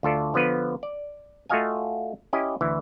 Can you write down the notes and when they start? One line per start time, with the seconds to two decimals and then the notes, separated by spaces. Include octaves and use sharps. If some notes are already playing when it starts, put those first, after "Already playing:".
0.03 D2 F4 A4 D5
0.34 D3 F3 B3 B4
0.83 D5
1.49 A3 F4 F#4 D#5 F5 G#5
2.33 C#4 E4 G4 D#5
2.61 D2 E3 E4